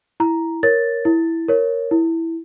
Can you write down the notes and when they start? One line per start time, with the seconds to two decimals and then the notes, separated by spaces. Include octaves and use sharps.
0.20 E4 A#5
0.63 A#4 C#5 A6
1.05 E4
1.49 A#4 C#5
1.91 E4